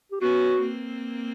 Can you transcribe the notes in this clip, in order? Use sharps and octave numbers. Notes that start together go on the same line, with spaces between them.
G4
B3 C#4 F#4
A#3 C4